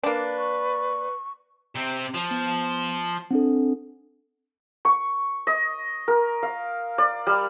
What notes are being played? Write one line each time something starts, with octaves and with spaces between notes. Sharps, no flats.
A#3 D4 B4
C#6
C3 C4
F3
B3
C4 D4 A4
C#6
D#5
A#4
F5
D5
G3